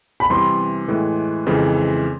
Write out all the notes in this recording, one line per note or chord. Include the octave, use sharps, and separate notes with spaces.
B5
C3 E3 G3 C6
A2 E3 G#3
F2 C#3 E3 G#3 C4